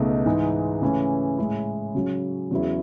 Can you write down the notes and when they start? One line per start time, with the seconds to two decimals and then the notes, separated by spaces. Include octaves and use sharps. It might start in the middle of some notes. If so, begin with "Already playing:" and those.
Already playing: C#2 B2 A3 D#4
0.26 G#2 E3 G#3 D#4
0.82 C#3 E3 A3 C#4
1.38 A2 G#3 C#4 E4
1.95 C#3 F#3 C#4
2.51 E2 C#3 F#3 B3 E4